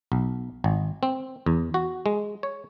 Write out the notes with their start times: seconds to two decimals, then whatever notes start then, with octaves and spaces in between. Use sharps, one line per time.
0.12 B1
0.64 G#1
1.03 C4
1.46 E2
1.74 F#4
2.06 G#3
2.43 C#5